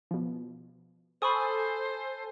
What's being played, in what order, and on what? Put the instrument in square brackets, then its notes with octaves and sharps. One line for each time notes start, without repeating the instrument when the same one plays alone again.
[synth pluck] B2 F3
[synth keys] A4 G#5 A5 [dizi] C5 [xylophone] B5 C#6 D#6